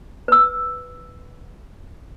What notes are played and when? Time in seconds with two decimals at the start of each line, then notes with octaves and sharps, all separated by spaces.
0.28 B4 E6